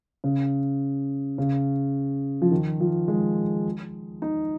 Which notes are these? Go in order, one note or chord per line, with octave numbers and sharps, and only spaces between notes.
C#3
C#3
F3
D#3
F3
G#3
D#4